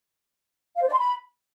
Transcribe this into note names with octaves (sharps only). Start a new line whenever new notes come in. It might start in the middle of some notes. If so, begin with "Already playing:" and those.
F5
C5
D5
C6
B5